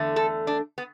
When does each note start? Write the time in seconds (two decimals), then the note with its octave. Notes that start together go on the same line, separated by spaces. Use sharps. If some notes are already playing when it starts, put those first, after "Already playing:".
Already playing: E2 D3 A3
0.16 A4
0.47 D4
0.78 B3